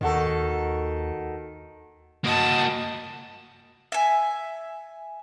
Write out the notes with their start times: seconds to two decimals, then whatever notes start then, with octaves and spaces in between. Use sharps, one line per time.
0.01 D#2 D#3 F#4 A4
2.24 A#3 F#4 D#5 A5
3.92 E5 G#5